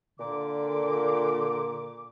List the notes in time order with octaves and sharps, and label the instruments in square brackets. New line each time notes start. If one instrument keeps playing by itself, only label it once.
[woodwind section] A#2 D6 [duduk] D3